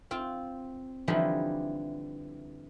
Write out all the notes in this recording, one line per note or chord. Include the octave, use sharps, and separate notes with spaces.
C4 F4
D3 E3 F3 G3 D#4 E4